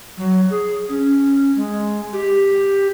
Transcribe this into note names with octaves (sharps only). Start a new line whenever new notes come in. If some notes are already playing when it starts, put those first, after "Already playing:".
F#3
G#4
C#4
G#3
G4